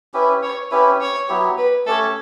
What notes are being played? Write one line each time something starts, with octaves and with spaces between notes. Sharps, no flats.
C#4 E4 G4 B4
C#5
C#4 E4 G4 B4
C#5
F#3 B3 E4 G4
B4
A3 C#4 G4 A4 C#5